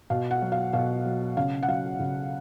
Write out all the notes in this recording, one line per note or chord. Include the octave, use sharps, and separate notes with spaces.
B2 F5
F#5
F#3
F5
B2 F5
F#3
C#3 F5
F#5
F#3 F5
C#3